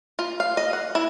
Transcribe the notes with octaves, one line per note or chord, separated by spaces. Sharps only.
F4
F5
D#5
F#5
E4